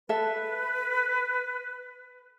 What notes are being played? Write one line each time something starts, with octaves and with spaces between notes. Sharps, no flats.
A4 B4 E5